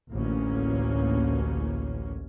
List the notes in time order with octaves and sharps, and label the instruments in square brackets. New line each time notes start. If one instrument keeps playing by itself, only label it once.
[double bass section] A1 D2 A#3 C#4